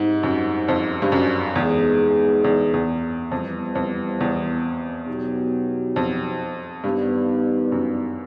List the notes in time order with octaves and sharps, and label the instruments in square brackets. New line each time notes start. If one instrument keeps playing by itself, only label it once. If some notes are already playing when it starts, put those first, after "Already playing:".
Already playing: [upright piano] G#2 [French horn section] G3 C4 D#4
[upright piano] F#2
F2
G2
F#2
[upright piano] E2 [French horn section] G#3 B3 D#4 G#4
[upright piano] E2
E2
[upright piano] F2 [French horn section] E3 G3 B3
[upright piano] F2
E2
[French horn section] B2 F#3 B3 D#4 G4
[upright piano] F2
[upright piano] G2 [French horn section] D#3 G3 B3 D#4
[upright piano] F#2